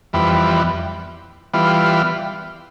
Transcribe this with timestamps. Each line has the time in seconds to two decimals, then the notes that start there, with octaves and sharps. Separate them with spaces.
0.13 F2 E3 G3 B3
1.53 E3 G3 B3 F4